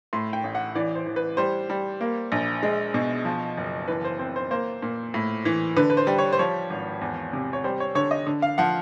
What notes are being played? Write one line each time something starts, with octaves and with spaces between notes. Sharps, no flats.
A2 C6
G5
A1
F#5
E3 D5
C5
E3
B4
G3 C5
G3
A#3
A#1
G#3
B2
F3
F#1
E3 B4
C5
C4 C5
C5
A#3 C5
A#2
A2
E3
D3 B4
B4
C5
G3
C#5
C5
F3 C#5
G#1
E2
C3
C#5
G3 C5
C#5
D3 C#5
D#5
D3
F5
F3 F#5